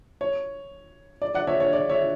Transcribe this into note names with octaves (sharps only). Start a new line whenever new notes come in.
C#5
D5
D5 F#5
C#5 E5
C#5
D5
C#5 E5